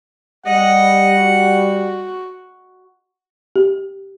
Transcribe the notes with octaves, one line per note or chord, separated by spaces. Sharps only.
G3 D#5 F#5
F#4
G4